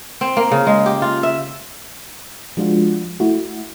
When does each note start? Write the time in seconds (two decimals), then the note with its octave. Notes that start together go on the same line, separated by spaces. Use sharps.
0.21 C4
0.37 A#3
0.51 C#3
0.67 G#3
0.86 G4
1.02 F4
1.23 E5
2.57 F3 G#3 D4 F4 F#4
3.20 A3 E4 F#4